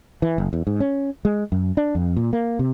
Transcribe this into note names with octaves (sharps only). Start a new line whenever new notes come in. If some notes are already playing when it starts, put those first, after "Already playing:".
E3
F#1
E2
G#2
C#4
G#3
F#2
D4
F2
A#2
A#3
C3